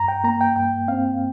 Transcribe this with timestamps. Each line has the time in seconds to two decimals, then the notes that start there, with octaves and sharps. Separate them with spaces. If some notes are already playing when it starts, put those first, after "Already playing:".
Already playing: G2 A#5
0.08 G5
0.24 A#3 A#5
0.41 G5
0.56 G2 G5
0.88 C4 F5